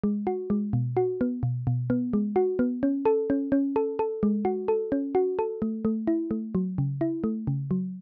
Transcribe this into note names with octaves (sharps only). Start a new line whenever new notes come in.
G#3
F#4
G#3
B2
F#4
B3
B2
B2
B3
G#3
F#4
B3
C#4
A4
C#4
C#4
A4
A4
G#3
F#4
A4
C#4
F#4
A4
A3
A3
E4
A3
F#3
C#3
E4
A3
C#3
F#3